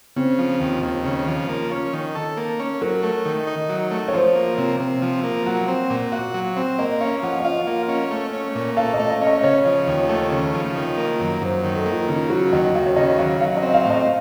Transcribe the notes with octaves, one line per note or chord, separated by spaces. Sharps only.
C#3 C4
F3
D#2
D#2
C#3
F3
A#3
C#4
D#3
A4
A#3
C#4
F#3 A#4
A3
D#3
D#4
F#3
A3
C#5
F3 C5
A#3
C3
C3
F3
A#3
F#3 F#5
C4
A#2
F#4 F5
F#3
C4
A#3 D#5
C#4 F5
F3 F#5
D#5
F4 F5
A#3
C#4
A3
C#4
A#2
A4 F5
D#5
A3
D#5
C#4
D#5
C#3 C#5
F3
D#2
A3
C#3
F3
D#3
A#3
F#2
F#2 C5
C5
D#3
A4
A#3
F4
C#3 D#4
F#3 F#4
D#2 D#5
D#2 F5
C#5
C#3 D#5
F#3 F5
F#3 F5
D#5
C4
F5
A2
D#5